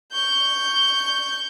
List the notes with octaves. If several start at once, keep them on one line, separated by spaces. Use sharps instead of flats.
C#6 G6